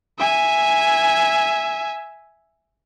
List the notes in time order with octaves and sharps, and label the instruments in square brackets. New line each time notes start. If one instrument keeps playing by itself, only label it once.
[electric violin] E5 G#5